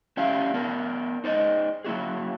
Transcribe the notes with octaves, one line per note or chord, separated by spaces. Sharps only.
C#4 D4 E4 G4 E5 F5
B3 D4 A#4
D#4 C5 D5 D#5
F#3 A#3 E4 F#4 G#4